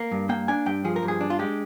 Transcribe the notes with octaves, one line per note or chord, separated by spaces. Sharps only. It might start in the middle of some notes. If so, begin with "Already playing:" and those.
Already playing: A#3
G2
A#3 G5
D4 G#5
G2 G5
F3 G#4
A#4
G2
G#4
D4
F4
G#3 G4